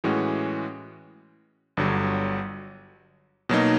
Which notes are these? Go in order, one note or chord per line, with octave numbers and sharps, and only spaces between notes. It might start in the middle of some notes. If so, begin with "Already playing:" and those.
A2 E3 G#3 C#4 F#4
G1 G2 D3 F#3
B2 F#3 A#3 D#4